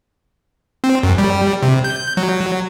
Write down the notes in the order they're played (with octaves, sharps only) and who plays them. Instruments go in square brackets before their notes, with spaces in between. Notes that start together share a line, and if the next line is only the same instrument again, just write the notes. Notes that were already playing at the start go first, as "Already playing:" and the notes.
[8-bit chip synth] C4
F#2
G3
C3
G6
F#3